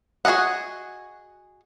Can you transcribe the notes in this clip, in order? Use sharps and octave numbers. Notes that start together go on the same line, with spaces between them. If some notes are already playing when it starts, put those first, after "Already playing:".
F#4 G#4 A4 D#5 F#5